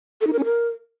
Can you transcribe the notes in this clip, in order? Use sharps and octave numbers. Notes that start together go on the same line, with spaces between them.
A4
D#4
A#4
C#4
A#4